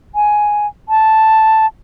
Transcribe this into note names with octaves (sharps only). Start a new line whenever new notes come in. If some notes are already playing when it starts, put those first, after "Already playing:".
G#5
A5